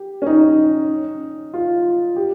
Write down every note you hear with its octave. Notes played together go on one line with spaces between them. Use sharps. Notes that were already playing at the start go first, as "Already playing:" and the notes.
Already playing: G4
C#4
D#4
F4
G4